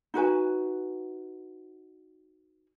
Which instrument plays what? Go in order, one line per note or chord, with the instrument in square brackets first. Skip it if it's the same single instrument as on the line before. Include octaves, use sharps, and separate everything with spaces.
[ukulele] D#4 F#4 B4 G#5